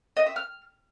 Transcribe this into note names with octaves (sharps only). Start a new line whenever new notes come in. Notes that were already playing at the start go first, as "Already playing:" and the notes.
D#5
E5
F6